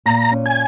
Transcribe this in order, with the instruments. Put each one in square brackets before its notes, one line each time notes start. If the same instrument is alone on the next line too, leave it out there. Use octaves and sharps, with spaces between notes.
[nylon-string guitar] A#2 [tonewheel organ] A#5
[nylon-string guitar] C#4
[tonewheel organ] G#5